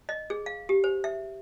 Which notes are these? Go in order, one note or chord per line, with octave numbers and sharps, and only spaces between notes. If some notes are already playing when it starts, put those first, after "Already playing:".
D#5
G#4
F5
G4
C5
E5